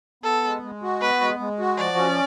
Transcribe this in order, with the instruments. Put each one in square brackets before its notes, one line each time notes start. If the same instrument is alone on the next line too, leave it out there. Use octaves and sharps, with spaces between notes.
[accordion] B3 [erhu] A4
[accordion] G#3
G#3
F#4
[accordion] B3 [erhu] B4
[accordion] G#3
G#3
F#4
[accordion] F3 [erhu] D5
[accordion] C#4